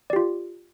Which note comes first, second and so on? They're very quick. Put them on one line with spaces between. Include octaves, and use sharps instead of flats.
D5 G4 F4